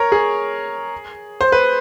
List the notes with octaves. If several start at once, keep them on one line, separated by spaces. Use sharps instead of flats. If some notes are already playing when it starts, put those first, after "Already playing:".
Already playing: A#4 C#5
G#4
C5
B4